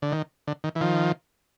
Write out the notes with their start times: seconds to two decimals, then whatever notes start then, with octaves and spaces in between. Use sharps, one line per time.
0.02 D3
0.12 D#3
0.48 D3
0.64 D#3
0.75 E3
0.81 D#3 F3